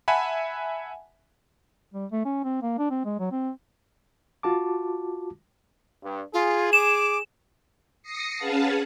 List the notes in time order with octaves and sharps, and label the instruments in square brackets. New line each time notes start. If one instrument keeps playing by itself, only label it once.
[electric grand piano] E5 F#5 G#5 A5 B5
[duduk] G3
A3
C#4
C4
A#3
D4
C4
G#3
F#3
C4
[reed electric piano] F4 F#4 A5 D6
[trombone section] G2
[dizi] F4 [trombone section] G#4
[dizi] D6 [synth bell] E7
[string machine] D#6 A#6 C7 C#7
C#4 G#4 B4 F5 F#5 A5